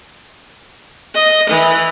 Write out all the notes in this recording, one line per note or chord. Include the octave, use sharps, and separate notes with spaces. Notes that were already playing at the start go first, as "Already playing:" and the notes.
D#5
E3